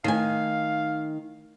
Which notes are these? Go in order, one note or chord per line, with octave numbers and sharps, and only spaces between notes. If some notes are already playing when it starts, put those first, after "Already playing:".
D#3 A3 F5 G#5